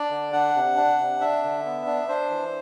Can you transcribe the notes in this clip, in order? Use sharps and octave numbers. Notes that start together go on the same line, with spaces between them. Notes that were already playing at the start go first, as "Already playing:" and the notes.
Already playing: D4 D5
D3
D4 F#5
C3
D4
C3
D4 E5
D3
B3
D4
D4 C5
E3